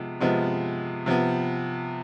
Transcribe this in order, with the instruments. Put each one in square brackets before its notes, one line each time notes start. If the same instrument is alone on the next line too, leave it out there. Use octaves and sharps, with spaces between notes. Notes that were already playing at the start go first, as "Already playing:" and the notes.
Already playing: [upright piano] C3 F3 G#3 B3
C3 F3 G#3 B3
C3 F3 B3